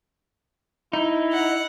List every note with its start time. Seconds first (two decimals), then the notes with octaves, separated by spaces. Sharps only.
0.93 D#4 E4
1.33 F#5